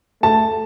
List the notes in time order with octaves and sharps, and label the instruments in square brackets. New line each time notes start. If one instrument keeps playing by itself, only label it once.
[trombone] A3 [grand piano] A5